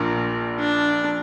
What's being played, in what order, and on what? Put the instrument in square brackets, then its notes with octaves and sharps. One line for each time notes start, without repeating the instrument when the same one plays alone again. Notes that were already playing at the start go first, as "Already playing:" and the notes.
Already playing: [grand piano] A#1 A#2 A#3 D4
[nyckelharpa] D4